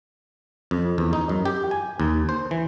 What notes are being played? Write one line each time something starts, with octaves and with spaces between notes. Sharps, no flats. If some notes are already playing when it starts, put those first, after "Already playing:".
F2
E2
D#4
F#2
G4
G#5
D#2
C5
E3